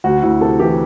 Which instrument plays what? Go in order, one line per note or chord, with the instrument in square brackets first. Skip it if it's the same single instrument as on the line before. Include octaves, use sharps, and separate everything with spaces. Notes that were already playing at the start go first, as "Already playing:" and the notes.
[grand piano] D2 F#4
D2 E4
C3 A4
E3 G4